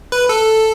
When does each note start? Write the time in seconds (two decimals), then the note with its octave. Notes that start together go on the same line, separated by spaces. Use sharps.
0.12 B4
0.29 A4